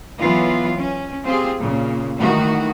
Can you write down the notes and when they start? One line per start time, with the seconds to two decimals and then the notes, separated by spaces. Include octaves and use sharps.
0.19 E3 F#3 B3 F4
0.77 C#4
1.25 C4 F4 G4 G#4
1.60 A#2 C#3
2.17 G2 D#3 E3 A3 F#4